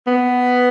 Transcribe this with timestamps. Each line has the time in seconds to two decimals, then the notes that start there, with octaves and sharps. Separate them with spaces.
0.07 B3